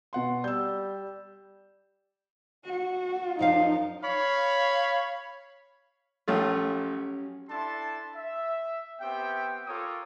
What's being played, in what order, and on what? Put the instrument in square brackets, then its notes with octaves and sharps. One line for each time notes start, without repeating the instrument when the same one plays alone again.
[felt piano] B2 F#5 C6
[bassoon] G3 [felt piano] E6 G6
[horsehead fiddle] F#4
[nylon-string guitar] F#2 F3 F5 [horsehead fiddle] D#4
[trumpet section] C#5 F5 B5
[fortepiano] A#1 A3 F4 [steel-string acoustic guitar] F#3 C#4 G4
[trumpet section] D4 E4 A4 A5 C6
E5
B3 C4 G4 E5 G5
F4 A4 A#4 C#5 D6 D#6